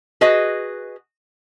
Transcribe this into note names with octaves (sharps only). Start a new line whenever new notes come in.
F#4 G#4 B4 D#5